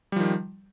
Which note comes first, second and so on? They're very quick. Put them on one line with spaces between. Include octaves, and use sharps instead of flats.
G3 F3 D#3